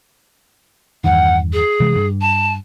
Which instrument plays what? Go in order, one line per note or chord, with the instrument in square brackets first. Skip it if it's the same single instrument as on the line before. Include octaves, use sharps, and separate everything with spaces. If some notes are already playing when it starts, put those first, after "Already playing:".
[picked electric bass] E2 G2 D#3 [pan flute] F#5
[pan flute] G#4
[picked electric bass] C3 E3 G#3
G2
[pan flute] A5